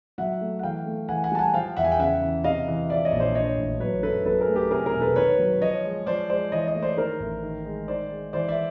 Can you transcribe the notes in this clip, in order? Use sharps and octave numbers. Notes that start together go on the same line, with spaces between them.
F#3 E5 F#5
A3
F#5
E3 F5 G5
A3
E3 F#5 G#5
F#5 G#5
G3 A5
F#5 G#5
F3 F5 G5
E2 E5 F#5
G#5
G5
C#3 E5 F#5
E3
C3 D#5 F5
E3
F3 D5 E5
C#5 D#5
A#1
C5 D5
D3 C#5 D#5
A1
F#3 B4 C#5
F#2 A4 B4
F#3 A4 B4
G#4 A#4
A3
G4 A4
C3 G#4 A#4
G#4 A#4
E1
A4 B4
D#3 B4 C#5
F#3
F3 C#5 D#5
G#3
F3 C5 D5
G#3 C5 D5
E3 C#5 D#5
C#5 D#5
A3
C5 D5
D#3 A#4 C5
A1
D#3
G#3
D#3 C5 D5
G#3
E3 C5 D5
D5 E5